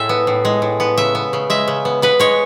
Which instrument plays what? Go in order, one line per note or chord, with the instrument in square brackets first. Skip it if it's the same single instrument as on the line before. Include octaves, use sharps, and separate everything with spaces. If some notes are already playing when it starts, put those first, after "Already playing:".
Already playing: [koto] A2 G#3 E5
B3
A2
G#3
A2
B3
C#3 E5
B3
C#3
G#3 E5
C#3
B3
B3 B4
G#3 C#5